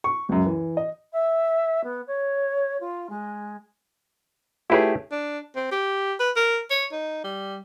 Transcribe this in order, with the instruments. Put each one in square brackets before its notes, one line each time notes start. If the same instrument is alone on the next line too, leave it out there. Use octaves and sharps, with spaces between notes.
[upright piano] C#6
C#2 F#2
E3
D#5
[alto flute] E5
B3
C#5
F4
G#3
[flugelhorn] A3 [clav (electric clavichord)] E4 G4 G#4 [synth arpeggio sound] F4 B4 C#5
[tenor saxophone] D4
C4
G4
B4
A#4
C#5
D#4
G3